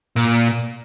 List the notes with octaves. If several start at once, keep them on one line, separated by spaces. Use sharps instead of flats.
A#2